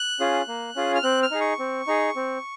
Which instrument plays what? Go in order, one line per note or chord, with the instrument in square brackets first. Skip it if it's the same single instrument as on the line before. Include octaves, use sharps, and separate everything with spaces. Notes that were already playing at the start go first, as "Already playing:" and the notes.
Already playing: [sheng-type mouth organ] F#6
C#4 F4 G#4
A#3
C#4 F4 G#4
F6
C4 F#6
F6
D#4 G#4
C#6
C4
D#4 G#4
C4